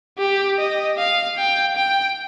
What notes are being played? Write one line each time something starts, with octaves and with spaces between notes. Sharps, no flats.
G4
D#5
F5
G5
G5